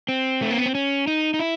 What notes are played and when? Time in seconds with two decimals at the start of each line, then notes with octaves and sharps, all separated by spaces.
0.09 C4
0.42 A3
0.51 A#3
0.58 B3
0.66 C4
0.75 C#4
1.07 D#4
1.34 D#4
1.39 E4